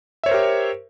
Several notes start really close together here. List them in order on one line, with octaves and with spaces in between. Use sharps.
E5 C#5 C5 A#4 G4